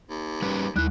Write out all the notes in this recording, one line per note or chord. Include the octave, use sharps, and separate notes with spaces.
D#2
G3 C#4 B4
D#2 G3 E4 F#6